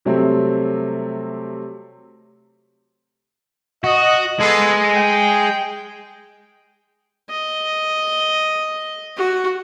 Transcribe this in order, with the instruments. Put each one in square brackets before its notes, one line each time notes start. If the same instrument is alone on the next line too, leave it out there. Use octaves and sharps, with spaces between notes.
[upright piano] C3 F#3 G3 A3 C4
[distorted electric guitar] F#4 [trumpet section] D#5
[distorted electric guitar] G#3 [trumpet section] B3 A4
[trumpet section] G5
[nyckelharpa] D#5
F#4